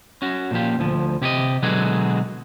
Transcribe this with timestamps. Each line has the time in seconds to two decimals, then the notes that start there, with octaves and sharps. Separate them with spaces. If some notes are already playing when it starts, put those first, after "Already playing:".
0.22 C#4 F#4
0.51 A#2 F3 G4
0.79 D2 F3
1.22 C3 G4 C#5 D#5
1.63 B2 D3 F#3 G#3 F#4 G#4